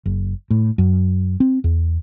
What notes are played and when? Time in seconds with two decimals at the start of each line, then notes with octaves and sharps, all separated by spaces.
0.06 F#1
0.50 A2
0.78 F#2
1.40 C4
1.64 E2